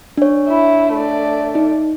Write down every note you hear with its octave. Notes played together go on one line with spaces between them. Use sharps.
D4 C#5
E4
A3 D5
D#4